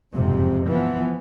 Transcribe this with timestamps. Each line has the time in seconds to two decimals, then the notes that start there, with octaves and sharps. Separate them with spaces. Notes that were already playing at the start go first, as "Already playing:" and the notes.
0.15 F#1 F2 G#2 C3
0.68 E3 F3 B3